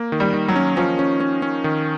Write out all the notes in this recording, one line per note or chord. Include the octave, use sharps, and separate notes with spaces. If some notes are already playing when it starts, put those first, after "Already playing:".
Already playing: A#3
D#3
G3
D#3
F#3
C#4
F3 C#4
C#4
C#4
C#4
D#3